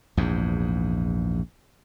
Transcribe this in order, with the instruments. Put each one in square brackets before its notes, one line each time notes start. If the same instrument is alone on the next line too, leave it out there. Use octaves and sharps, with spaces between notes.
[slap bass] A#1 E2 G#2